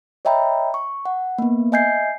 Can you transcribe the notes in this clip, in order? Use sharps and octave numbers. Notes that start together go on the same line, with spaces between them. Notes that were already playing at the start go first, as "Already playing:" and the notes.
C#5 D#5 E5 G5 A#5 B5
C#6
F#5
A#3 B3
D#5 E5 G#5 G6 G#6 C7